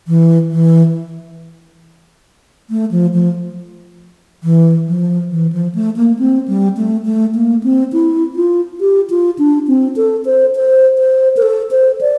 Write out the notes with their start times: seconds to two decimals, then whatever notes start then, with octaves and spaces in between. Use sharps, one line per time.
0.07 E3
0.52 E3
2.70 A3
2.91 F3
3.14 F3
4.43 E3
4.88 F3
5.31 E3
5.52 F3
5.75 A3
5.96 A#3
6.19 C4
6.48 G3
6.77 A3
7.05 A3
7.35 A#3
7.63 C4
7.93 E4
8.36 F4
8.80 G4
9.10 F4
9.38 D4
9.67 C4
9.96 A4
10.25 C5
10.55 C5
10.98 C5
11.37 A#4
11.42 A4
11.71 C5
12.01 D5